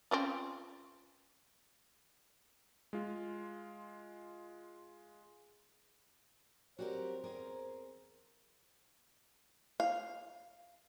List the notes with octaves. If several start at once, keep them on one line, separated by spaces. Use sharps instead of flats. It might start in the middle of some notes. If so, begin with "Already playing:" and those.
C4 C#4 F4
G#3 F4
F#3 G3 C4 F#4 G4 A#4 C5
E2 C4 G#4 A#4
F5